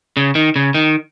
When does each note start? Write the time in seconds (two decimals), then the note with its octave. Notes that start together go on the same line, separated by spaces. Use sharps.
0.17 C#3
0.35 D#3
0.56 C#3
0.74 D#3